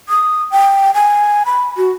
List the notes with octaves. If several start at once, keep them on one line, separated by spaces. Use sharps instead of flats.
D#6
G5
G#5
B5
F#4